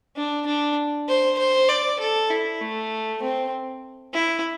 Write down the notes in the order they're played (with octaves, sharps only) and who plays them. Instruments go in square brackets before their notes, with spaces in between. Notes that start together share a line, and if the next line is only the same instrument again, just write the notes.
[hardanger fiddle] D4
D4
C5
C5
D5
A4
E4
A3
C4
E4